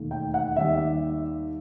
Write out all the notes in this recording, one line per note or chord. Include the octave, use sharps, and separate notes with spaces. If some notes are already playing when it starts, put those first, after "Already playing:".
Already playing: E1 D#2 D#3 A3
G5
F#5
D#2 D#3 G3 E5